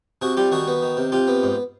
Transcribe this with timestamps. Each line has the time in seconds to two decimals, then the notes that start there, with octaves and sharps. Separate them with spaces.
0.22 C3 F#4 G#4
0.37 G3 F4 G4
0.52 D#3 F#4 G#4
0.68 B3
0.82 D#3
0.97 C3
1.12 C3 F4 G4
1.28 B3
1.43 G#2